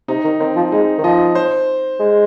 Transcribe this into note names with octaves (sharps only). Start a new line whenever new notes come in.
C3 D#4
D#3
D#3 C4
F3
G#3 D#4
D#3
F3 D#5
C5
G#3